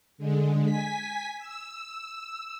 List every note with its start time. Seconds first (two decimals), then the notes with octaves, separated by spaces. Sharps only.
0.18 D3 G#3
0.65 G#5 B6
1.39 E6